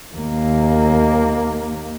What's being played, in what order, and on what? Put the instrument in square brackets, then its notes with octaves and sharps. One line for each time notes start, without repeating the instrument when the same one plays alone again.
[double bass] D#2 A#3